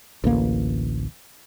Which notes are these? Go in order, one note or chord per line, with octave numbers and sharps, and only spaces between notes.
A1 D2 A#3